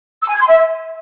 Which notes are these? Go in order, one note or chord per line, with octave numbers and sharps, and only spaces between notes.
E6
G#5
G#6
C6
E5